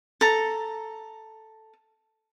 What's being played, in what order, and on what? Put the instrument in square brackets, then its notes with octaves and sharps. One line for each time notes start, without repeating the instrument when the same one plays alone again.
[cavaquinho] A4 A#5